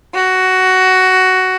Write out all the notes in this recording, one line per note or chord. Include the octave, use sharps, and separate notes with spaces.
F#4